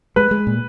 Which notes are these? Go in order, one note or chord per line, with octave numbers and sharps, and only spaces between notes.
G#3 B4
G#3
A#2